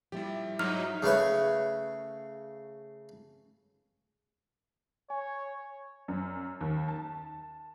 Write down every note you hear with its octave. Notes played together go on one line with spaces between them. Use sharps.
F3 G3 A3 E4 G4
G#2 F#3 D#4 F6
C#3 A3 B4 C#5
C#5 G#5
F#2
D#2
A5